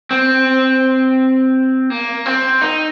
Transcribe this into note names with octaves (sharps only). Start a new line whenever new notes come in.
C4
A#3
C4
D#4